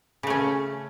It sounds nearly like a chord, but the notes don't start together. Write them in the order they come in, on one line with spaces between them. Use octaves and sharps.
C#3 A3 C#4